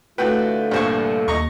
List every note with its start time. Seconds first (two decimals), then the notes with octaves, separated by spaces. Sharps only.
0.18 A2 D3 A3 F4 F#4 B4 G5
0.71 C2 G2 A#2 C5 C#6
1.28 D#2 D#5 A#5 C#6